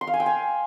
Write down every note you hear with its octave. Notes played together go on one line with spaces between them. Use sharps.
C6
F5
G#5
G5
G#5